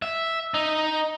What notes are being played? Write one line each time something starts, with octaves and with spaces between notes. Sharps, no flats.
E5
D#4